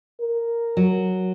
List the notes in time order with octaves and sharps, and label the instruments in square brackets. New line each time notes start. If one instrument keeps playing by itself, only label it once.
[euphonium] A#4
[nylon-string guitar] F#3